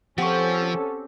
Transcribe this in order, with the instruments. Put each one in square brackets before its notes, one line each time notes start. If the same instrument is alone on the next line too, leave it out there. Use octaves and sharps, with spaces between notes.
[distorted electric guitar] F3 [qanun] C4 G4 [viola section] C#4 A4 [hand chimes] F#5 C#6